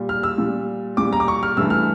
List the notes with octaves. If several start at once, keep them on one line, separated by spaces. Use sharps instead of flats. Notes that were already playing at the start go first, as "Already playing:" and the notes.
Already playing: A#2 G3
F6
E6
A#2 G3
A#2 G3 D6
A#5
D6
C#6
F6
G2 E3 A3 E6
F6